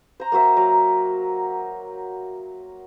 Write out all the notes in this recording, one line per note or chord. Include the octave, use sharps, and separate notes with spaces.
C5 A#5
A#3 F#4 C5 E5
F#3 A#4 D6